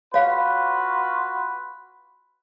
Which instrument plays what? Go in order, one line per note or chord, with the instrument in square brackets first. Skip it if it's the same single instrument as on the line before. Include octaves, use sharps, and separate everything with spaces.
[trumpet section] F4 F#4 B4 [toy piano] C#5 F5